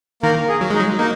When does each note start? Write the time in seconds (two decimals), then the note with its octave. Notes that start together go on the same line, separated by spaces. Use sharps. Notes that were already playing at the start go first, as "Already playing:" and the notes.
0.23 D#3 A#3 A#4
0.49 G#4
0.61 F#3
0.70 G#3 D#4
0.80 F#3
0.99 A#3 D#4